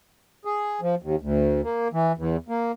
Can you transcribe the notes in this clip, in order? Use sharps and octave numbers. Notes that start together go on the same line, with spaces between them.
G#4
F3
D#2
D2
A#3
E3
E2
A#3